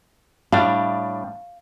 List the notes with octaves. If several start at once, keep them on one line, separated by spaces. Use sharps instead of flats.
A2 G3 D4 F5